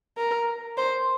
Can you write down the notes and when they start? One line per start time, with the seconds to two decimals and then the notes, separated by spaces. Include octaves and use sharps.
0.18 A#4
0.77 C5